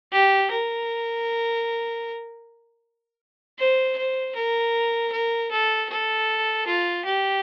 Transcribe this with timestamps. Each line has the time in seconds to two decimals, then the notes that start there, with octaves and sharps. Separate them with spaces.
0.12 G4
0.51 A#4
3.59 C5
3.97 C5
4.35 A#4
5.12 A#4
5.51 A4
5.89 A4
6.67 F4
7.05 G4